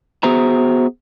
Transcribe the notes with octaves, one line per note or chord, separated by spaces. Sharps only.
B3 F#4 G#4 C5 E5 A#5